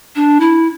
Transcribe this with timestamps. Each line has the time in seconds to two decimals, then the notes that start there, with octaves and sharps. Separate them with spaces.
0.16 D4
0.40 E4